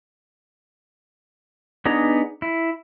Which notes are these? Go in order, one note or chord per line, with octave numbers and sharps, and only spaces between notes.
B3 D4 D#4 G#4 A#5
E4